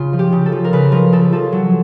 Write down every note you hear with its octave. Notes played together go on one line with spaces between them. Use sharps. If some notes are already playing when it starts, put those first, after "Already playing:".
Already playing: C#3 F4
F3
G4
C#3
A4
F3
A#4
C#3 B4
F3 A#4
C#3 A4
F3 A4
F#3